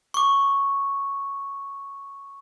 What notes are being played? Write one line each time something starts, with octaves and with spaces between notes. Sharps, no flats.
C#6 D6